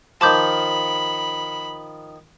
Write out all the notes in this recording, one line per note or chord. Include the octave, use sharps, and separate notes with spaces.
D#3 F3 A5 B5 D6 G6